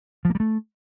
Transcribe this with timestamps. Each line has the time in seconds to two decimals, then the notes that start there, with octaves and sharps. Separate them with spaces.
0.25 F3
0.30 A#3
0.35 G3
0.40 A3